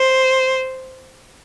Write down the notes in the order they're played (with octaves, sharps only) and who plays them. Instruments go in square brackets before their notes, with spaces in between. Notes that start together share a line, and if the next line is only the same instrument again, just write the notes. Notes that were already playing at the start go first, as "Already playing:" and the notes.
Already playing: [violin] C5